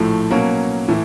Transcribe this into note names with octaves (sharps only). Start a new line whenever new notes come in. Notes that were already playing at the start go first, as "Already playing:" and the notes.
Already playing: A#1 A2 F3 A3
B2 F#3 A#3 C#4
A2 E3